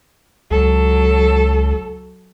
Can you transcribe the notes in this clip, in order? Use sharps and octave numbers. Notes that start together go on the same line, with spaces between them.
C#2 F#3 A4